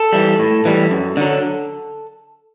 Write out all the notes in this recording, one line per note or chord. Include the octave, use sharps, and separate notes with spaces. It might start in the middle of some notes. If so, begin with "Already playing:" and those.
Already playing: A4
E3 G3
A2
E3 G3
F#2
D3 F#3